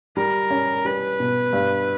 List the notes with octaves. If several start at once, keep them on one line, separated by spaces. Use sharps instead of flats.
G3 A#4
C#4
G3 B4
B2
G2